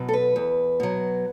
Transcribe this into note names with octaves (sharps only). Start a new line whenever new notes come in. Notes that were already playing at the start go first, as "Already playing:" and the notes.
Already playing: B2 F#3
A4
B4
E2
B2 F#3